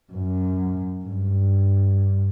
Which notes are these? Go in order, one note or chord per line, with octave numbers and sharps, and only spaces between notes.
F#2
G2